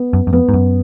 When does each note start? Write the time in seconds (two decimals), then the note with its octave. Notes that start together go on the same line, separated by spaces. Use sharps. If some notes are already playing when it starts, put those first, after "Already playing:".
Already playing: B3
0.13 F#2
0.27 F#2
0.33 F2 B3
0.49 G#2
0.54 F#2